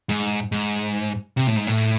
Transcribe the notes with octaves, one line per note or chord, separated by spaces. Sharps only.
G#2
G#2
C3
A2
G#2
A2